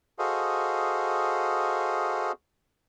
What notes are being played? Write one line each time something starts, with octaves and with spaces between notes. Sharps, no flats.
F#4 G#4 A4 C5 D#5 F5